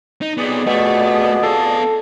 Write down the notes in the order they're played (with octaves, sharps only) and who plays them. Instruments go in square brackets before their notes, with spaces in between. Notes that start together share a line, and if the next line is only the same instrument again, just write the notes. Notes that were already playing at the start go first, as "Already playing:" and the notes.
[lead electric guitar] D#4
[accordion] F2 G#4 D5 [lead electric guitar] B3 D#4
[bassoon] B2 [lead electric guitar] A3
[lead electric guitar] B3 F5 [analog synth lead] A4